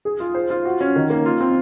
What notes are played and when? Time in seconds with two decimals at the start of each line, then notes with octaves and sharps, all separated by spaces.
0.05 G#4
0.20 F4
0.34 C5
0.50 F4
0.65 F#4
0.81 C#4
0.96 D#3
1.10 A#3
1.26 F4
1.41 C4